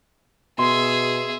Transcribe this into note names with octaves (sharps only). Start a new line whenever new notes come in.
B2 G#4 E5 C6